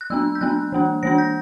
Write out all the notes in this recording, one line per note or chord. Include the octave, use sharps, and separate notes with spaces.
F#6
F#3 B3 D4 E6
G6
F#3 B3 D4 F#6
E3 A#3 D4
E3 A#3 D4 A#6
G6